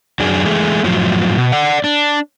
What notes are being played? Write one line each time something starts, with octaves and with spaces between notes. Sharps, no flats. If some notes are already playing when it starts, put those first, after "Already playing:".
F#2 F#3 D4 G#4
E3 G#3 A3 G#4
F#2 A2 F3 F#3
B2
D5 F#5
D4